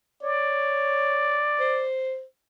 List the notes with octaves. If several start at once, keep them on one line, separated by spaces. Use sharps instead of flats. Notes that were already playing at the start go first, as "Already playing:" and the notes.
C#5 D5
C5